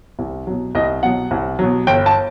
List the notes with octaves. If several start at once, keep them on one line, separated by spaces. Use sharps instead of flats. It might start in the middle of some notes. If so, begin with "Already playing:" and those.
C2
B2 F#3
C2 D#5
B2 F#3 F#5
C2
B2 F#3
G1 G5
A5